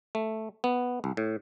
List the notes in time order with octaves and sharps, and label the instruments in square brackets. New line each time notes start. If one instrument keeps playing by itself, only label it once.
[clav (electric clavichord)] A3
B3
C2
A2